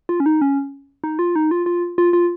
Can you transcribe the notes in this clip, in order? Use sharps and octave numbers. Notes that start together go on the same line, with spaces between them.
F4
C#4
D#4
C#4
D#4
F4
D#4
F4
F4
F4
F4